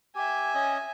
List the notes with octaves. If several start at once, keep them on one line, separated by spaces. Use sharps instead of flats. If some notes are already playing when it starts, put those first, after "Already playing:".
G4 E5 G#5
C#4 D#5